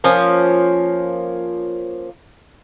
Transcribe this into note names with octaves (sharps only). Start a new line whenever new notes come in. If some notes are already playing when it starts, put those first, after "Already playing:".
F3 A#3 C#4